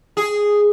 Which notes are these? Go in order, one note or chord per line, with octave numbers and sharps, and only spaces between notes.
G#4